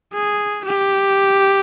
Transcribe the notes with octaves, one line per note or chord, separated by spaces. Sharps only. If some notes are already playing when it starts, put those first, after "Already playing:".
G#4
G4